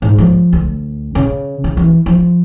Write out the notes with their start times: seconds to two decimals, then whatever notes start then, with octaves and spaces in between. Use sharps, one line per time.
0.02 G#2
0.18 F3
0.53 D2
1.15 C#3
1.64 C#3
1.77 E3
2.06 F3